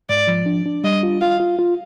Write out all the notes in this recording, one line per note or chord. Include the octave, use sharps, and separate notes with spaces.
G#2 D5
F3
D4
D4
G3 D#5
F4
F4 F5
F4
F4